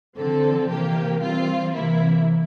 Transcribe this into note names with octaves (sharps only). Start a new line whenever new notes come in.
D3 F3 C4 A4
C3 E3 A#3 G4
E3 G3 C4 F4
C3 E3 A#3 E4